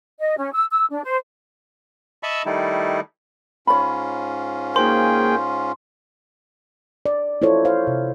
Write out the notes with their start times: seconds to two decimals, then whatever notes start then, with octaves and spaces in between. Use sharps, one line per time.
0.20 D#5
0.37 C#4
0.53 E6
0.71 E6
0.91 D4
1.04 C5
2.23 D#5 E5 A5 B5 C#6 E6
2.46 D#3 G3 A3 D#4 E4
3.67 G#2 C#4 F4 C#5 B5
4.76 A#3 D#4 F#4 G#4 C5 G5 C6
7.06 D5
7.42 E4 F4 A4 C5 C#5
7.65 C5 F5
7.87 C3